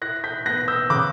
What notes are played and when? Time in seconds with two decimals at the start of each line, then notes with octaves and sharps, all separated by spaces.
0.01 E4 F#6 A#6
0.24 G6 B6
0.46 B3 F#6 A#6
0.68 E6 G6
0.90 C#3 D6 F#6